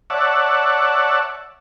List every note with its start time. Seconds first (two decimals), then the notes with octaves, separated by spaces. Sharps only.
0.10 C#5 D5 E5 F#5 A5